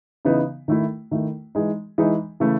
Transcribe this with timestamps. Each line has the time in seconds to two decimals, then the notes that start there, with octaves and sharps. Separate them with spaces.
0.25 C#3 E3 B3 D#4
0.68 D#3 A3 E4
1.11 D#3 A3 E4
1.55 E3 G#3 D#4
1.98 E3 G#3 D#4
2.40 C#3 E3 A3